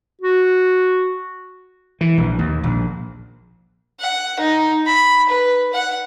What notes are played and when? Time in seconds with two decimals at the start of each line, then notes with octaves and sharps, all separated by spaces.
0.22 F#4
2.01 E3
2.18 A#1
2.39 D#2
2.63 A#1
4.00 F#5
4.40 D#4
4.86 B5
5.29 B4
5.73 F#5